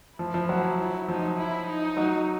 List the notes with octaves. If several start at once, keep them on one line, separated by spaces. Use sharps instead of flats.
F3 E4
F3
F#3
F3 D#4
E4
D#4
F#3